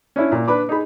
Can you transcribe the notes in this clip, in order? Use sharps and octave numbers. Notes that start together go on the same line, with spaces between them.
C#4 D4 E4
A#2
D4 B4 B5 D6
D#4 G#4 B5